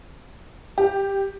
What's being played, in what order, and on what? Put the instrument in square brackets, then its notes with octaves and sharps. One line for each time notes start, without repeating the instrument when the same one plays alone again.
[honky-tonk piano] G4